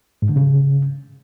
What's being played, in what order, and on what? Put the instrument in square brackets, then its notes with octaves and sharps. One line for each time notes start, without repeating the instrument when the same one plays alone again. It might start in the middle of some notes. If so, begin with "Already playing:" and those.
[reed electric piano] G#2
D3
C#3